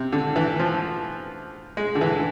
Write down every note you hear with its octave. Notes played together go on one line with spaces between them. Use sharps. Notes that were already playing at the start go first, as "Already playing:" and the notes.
Already playing: C3
D3
E3
F3
G#3
D3
E3